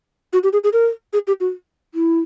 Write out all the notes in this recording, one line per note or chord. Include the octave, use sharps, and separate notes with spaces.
F#4
G4
G#4
G#4
A#4
G#4
G4
F#4
E4